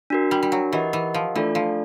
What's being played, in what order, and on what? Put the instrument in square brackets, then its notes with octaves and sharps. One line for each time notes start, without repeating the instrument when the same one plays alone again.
[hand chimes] D4 F#4 A#4
[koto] G3
G3
F#3
[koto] E3 [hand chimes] G4 A#4 D#5 F#5
[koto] E3
F3
[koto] E3 [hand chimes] A3 D4 F4 A4 D5
[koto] F3